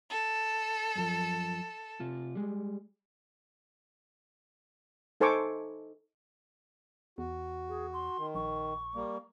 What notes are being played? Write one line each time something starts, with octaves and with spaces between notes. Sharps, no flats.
A4
F#2 F3
C3 F4
G3 G#3
D#4 A4 C5 G#5 C#6 D6
E2 F#4
G#4
C6
D#3
A#1 C#6
G3 A#3